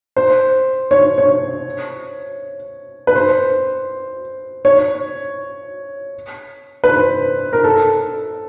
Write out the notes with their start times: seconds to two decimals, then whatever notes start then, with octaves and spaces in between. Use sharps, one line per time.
0.16 C5
0.91 C#5
1.18 C#5
3.07 B4
3.15 C5
4.65 C#5
6.84 B4
6.90 C5
7.53 A#4
7.64 A4